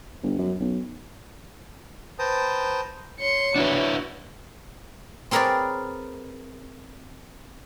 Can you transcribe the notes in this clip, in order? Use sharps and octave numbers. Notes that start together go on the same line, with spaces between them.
G1
F#2
B1
B4 C5 G5 A5 A#5 D#6
C#5 C6 C#7
D4 E4 F#4 B4
C4 G#4 A#4 B4 C#5 D5